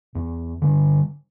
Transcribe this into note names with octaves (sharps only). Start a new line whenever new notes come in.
E2
D3 G3